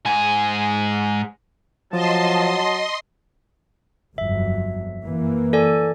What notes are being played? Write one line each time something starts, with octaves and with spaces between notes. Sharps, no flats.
G#2 G#4
F3 F#3 D#5 A5 C6
G1 F2 F#3 E5
F#2 E3 A#3
A4 D5 G#5